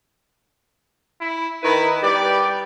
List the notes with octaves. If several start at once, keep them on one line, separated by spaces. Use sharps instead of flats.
E4
D#3 E4 B4
G3 B3 G4 D5